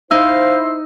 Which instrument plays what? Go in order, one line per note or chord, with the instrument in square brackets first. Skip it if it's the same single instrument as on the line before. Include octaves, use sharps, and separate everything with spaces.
[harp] D#4 [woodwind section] E4 C5 [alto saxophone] F5 [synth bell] E6